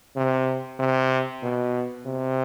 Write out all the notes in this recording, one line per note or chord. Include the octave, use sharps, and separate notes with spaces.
C3
C3
B2
C3